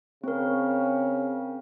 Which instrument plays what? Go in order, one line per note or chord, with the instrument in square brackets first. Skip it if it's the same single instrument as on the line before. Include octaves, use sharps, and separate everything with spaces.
[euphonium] C#3 [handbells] C4 A#4